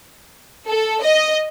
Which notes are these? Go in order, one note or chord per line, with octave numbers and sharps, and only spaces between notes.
A4
D#5